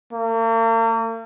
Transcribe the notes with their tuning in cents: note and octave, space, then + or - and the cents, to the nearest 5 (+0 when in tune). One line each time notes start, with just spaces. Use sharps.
A#3 -45